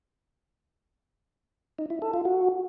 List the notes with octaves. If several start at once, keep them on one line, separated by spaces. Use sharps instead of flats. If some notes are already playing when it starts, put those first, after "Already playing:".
D#4
E4
A4
F4
F#4